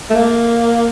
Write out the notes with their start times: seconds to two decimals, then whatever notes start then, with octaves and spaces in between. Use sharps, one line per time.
0.10 A3
0.15 A#3